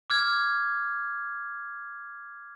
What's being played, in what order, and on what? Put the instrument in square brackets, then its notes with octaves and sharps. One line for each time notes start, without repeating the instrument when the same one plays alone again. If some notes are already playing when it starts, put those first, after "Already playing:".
[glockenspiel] D6 F6 G#6